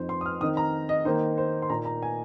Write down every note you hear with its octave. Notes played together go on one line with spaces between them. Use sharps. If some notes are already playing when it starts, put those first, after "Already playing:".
Already playing: F2 F3 C4 D#4 C5
C6
D#6
F6
D#3 C4 D#4 D#6
A#5
D#5
D#3 A#3 D#4 C5
C5
C6
A#2 A#3 D#4 A#5
A#5
G#5